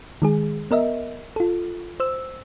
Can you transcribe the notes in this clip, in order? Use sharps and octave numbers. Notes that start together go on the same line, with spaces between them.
D#3 G#3 G#4
B3 A#4 D#5 E5
F4 A4
C5 E6